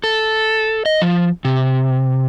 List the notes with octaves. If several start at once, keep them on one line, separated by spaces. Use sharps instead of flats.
A4
D#5
F3
C3